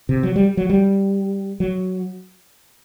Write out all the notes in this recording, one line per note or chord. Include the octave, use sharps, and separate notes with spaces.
C3
F#3
G3
F#3
G3
F#3